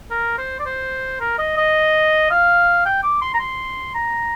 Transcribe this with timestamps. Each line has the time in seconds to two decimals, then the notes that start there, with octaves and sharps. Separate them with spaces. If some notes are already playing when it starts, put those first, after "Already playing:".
0.11 A#4
0.38 C5
0.59 D5
0.66 C5
1.21 A#4
1.39 D#5
1.57 D#5
2.31 F5
2.86 G5
3.03 D6
3.22 C6
3.34 A#5
3.40 C6
3.95 A#5